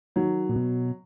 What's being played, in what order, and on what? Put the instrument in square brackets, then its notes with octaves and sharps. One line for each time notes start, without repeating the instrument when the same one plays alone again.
[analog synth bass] D#3 [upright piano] F#3
[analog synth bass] A#2
B2